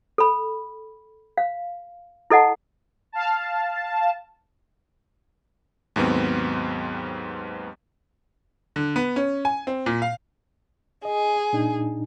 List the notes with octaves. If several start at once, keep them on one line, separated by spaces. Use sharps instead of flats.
A4 B5
F5
E4 A4 D#5 F#5 A5
F5 A5
D#2 G#2 F#3 B3 C4
D3
B3
C#4
G#5
C4
A#2
F5
G#4 D#5
A#2 D4 D#4